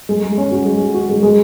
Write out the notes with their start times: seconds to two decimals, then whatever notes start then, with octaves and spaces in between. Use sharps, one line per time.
0.09 G#3
0.23 G#3
0.38 C#4
0.52 F#4
0.65 G#3
0.80 F#4
0.94 F#4
1.09 G#3
1.23 G#3